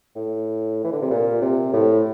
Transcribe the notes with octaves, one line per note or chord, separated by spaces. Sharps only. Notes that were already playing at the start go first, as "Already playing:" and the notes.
A2
E3
D3
C3
A#2
C3
A2